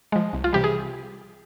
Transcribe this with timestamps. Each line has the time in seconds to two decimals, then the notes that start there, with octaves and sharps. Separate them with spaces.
0.12 F3 G#3
0.33 C2
0.44 F4
0.53 C3 E3 G3 G4
0.64 G#4